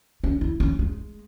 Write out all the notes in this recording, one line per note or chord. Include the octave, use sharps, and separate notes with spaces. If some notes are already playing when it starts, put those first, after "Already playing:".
C#4
E4
C#4
G#3